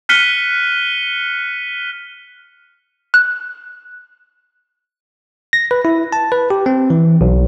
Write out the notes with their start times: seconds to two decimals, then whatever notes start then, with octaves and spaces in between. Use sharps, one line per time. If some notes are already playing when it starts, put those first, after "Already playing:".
0.09 F6 F#6 B6 C#7 D#7 G7
3.14 F#6
5.53 A#6
5.71 B4
5.85 E4
6.12 A5
6.32 B4
6.50 G4
6.66 C4
6.90 E3
7.21 B1